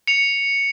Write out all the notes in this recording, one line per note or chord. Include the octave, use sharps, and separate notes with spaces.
C#7 F7